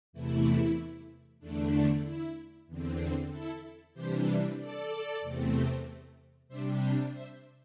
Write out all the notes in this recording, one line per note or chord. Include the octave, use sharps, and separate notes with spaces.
E2 C3 E3 A3 E4
E2 D3 A3 D4
E4
E2 D3 C4
E4 A4
C3 E3 G3 D4 G4 C5
A4 D5
E2 C3 A3 C4
C3 G3 D4 C5 E5
D5 G5
C5 E5